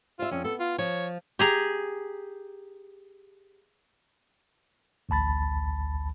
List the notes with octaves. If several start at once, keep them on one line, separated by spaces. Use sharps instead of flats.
F4 C5 E5
F2 C#4
B3 A4
F4
F3 C#5
G4 G#4 A#5
A1 D2 A5 B5 A6